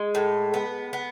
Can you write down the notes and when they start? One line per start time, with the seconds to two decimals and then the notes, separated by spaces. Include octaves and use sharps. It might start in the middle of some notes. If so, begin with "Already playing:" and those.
Already playing: G#3
0.15 A2
0.54 B3
0.93 B3